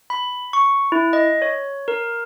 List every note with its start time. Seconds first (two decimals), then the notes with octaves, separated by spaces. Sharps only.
0.10 B5
0.53 C#6
0.92 E4
1.13 D#5
1.42 C#5
1.88 A#4